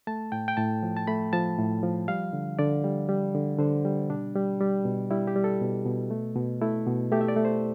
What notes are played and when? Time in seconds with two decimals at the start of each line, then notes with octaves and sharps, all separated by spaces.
0.07 A3 A5
0.32 A2 G5
0.48 G5
0.57 A2 A5
0.83 F3
0.97 A5
1.07 A3 B5
1.33 F3 A5
1.58 A2
1.83 F3
2.08 G3 F5
2.33 D3
2.59 D3 D5
2.84 G3
3.08 G3
3.35 D3
3.59 D3 C5
3.85 G3
4.10 B2 D4
4.35 G3
4.61 G3
4.85 B2
5.11 G3 E4
5.27 G4
5.36 G3
5.44 A4
5.61 B2
5.86 B2
6.11 A3
6.36 B2
6.61 A3 E4
6.87 B2
7.11 A3 G4
7.21 E5
7.28 D5
7.36 A3
7.45 C5